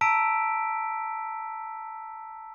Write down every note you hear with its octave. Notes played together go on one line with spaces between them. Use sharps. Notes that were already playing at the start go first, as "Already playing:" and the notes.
A5 A#5 E6 B6 D7